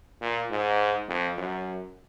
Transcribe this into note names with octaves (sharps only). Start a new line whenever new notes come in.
A#2
G#2
F2
F#2